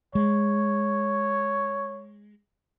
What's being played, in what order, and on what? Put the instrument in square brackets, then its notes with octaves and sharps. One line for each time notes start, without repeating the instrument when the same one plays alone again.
[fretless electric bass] G#3 [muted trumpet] C#5